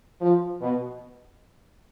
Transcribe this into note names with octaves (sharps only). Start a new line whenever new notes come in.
F3
B2